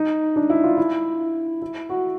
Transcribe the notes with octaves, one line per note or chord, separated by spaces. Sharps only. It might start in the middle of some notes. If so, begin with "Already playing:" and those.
Already playing: D#4
D4
E4
F4
E4
E4
F#4